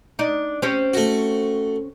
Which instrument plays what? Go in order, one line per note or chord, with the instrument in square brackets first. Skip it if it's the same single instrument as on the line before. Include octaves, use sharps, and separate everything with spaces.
[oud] D4 D#4
C4 C#4 G4
[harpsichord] A3 F#4